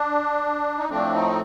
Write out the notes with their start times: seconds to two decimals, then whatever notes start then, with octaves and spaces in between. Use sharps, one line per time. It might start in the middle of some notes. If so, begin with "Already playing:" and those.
Already playing: D4
0.78 D#4
0.89 A2 F3 A3 C4 D4
1.14 D#4